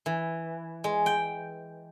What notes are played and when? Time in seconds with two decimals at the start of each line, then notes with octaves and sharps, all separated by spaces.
0.06 E3
0.84 G#3
1.06 G5